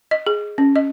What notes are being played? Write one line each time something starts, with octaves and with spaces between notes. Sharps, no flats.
D#5
G#4
C#4
D#5